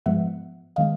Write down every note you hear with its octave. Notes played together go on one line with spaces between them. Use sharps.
G#2 F3 G#3 B3 E5 F#5
D#3 G#3 B3 D#5 F5